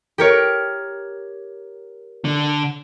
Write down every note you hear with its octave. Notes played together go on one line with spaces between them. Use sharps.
G4 A#4 C#5
D3